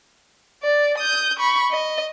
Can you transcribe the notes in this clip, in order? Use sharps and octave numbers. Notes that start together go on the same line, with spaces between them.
D5
D#6 G6
B5 C#6
D#5